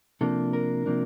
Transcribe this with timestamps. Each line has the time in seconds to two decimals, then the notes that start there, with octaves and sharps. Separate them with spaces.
0.21 C3 F3 A#3 D4 A4
0.53 A#4
0.86 C3 F3 A#3 D4